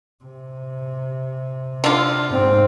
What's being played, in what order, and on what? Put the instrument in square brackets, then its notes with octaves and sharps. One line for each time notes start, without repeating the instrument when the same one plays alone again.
[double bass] C3
[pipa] D3 F4
[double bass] G#2 C4